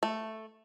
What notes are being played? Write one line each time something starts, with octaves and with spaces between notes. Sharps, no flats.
A3